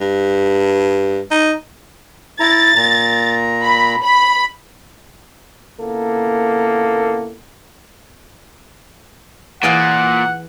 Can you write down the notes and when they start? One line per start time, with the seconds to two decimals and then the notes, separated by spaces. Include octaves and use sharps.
0.01 G2
1.31 D#4
2.40 E4 A#5 A6
2.76 A#2 A#5
3.62 B5
4.02 B5
5.78 A#2 C#3 A#3 B3 E4 A4
9.63 A#2 E3 G#4 F5 F#5